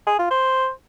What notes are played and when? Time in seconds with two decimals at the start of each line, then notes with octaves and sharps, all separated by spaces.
0.07 G#4
0.19 F4
0.31 C5